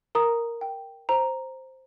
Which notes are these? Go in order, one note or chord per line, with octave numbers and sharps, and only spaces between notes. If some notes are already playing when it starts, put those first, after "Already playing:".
A#4 A#5 D#6
G5
C5 A#5